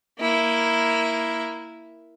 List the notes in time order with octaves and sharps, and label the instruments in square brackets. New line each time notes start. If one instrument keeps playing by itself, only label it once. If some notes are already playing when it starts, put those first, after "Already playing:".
[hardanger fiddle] A#3 E4